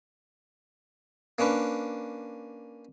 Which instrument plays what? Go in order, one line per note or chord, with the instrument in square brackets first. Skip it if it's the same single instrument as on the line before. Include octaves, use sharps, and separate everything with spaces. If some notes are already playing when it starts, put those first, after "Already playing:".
[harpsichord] A#3 C#4 D4 B4